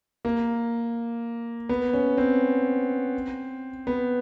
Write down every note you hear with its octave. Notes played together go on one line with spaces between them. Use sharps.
A#3
B3
C#4
C4
B3